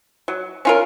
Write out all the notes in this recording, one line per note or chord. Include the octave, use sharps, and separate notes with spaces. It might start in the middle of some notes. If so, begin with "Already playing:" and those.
F#3
C#4 F4 A#4